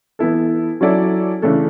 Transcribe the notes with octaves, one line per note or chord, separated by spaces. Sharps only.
E3 B3 E4 A4
F#3 C#4 E4 A4 D5
C#3 E3 A3 D4 A4